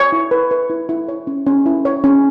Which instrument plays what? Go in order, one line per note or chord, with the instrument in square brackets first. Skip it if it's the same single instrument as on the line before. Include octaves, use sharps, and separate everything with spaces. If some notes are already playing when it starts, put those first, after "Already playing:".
Already playing: [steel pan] C#5
E4
B4
B4
E4
E4
C#5
C#4
C#4
E4
C#5
C#4